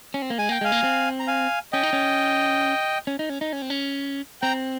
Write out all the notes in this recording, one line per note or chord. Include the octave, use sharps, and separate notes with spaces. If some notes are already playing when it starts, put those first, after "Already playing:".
C#4
C4
A#3
G#3 G#5
A#3 G5
G#3 F5 G#5
A#3
C4
A#5
F5 G#5
C#4 D#5 G5
D#4
C#4
C#4
D#4
C#4
D#4
C#4
C4
C#4
C4 G5 A#5